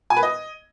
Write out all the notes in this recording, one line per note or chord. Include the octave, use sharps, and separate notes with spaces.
G#5
B4
D#5